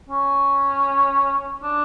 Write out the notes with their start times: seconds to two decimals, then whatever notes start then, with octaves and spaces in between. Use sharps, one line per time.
0.09 C#4
1.62 D4